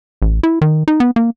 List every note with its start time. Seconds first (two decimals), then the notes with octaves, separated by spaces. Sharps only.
0.22 A1
0.43 E4
0.61 D#3
0.88 D#4
1.00 B3
1.16 A#3